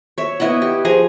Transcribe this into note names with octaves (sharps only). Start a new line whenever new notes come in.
C#5 E5
B3 E4 D#5 F#5
G4
F3 G#4 G#5 A#5